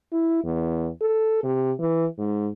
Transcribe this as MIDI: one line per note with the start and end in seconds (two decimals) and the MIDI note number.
0.13 0.43 64
0.44 0.89 40
1.02 1.40 69
1.44 1.72 48
1.79 2.05 52
2.18 2.49 44